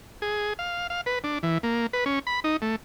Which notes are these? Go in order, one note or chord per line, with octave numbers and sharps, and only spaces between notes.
G#4
F5
F5
B4
D4
E3
A#3
B4
C#4
B5
D#4
A3